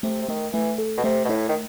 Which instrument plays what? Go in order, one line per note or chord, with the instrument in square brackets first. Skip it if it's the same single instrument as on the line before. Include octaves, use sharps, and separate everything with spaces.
[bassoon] C3 [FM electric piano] A3
[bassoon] C3
[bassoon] D#3 [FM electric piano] A3
[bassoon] E3 [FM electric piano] A3
[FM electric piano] A4
[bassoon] B2
[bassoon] C3 [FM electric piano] A3
[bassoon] B2
[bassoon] A2 [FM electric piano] E4
[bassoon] D#3